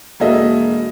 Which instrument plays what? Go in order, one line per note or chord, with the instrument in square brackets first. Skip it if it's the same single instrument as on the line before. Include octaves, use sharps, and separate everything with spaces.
[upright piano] E1 A#3 F#4 A4 D#5 E5